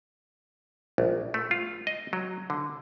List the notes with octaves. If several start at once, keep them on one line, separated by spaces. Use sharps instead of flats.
A#1
A3
F4
D#5
F#3
D3